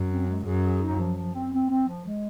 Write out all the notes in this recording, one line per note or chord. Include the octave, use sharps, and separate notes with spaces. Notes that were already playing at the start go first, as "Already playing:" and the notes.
Already playing: F#2
C4
G#3
F#2 G#4
G#4
D#4
F3
F3
C4
C4
C4
F3
G#3